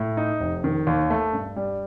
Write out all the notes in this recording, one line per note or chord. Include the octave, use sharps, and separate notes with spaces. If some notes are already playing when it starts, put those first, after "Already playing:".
Already playing: A2
D#4
F1
D#3
D#2
A3
G2
G3